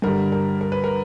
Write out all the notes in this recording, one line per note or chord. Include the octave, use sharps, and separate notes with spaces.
G2 D3 G3 A#4
A#4
A#4
B4
A#4